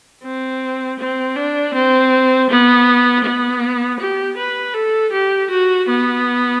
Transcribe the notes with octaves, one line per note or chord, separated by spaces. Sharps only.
C4
C4
D4
C4
B3
B3
G4
B4
A4
G4
F#4
B3